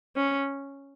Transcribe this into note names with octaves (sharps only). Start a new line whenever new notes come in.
C#4